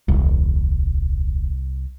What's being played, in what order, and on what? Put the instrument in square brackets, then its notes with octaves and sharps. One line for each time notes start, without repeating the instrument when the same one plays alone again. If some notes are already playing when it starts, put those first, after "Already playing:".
[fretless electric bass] D#1 [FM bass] C2